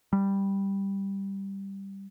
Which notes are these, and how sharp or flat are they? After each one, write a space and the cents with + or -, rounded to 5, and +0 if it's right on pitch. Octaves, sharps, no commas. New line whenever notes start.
G3 +0